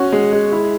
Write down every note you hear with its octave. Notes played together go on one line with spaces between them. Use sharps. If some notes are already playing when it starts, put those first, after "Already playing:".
Already playing: C#4 F#4
G#3
G#3
E4